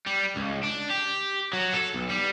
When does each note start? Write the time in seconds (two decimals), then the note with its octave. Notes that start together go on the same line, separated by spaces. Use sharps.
0.06 G3
0.36 C#2
0.63 D4
0.90 G4
1.53 F#3
1.74 A4
1.94 B1
2.09 G3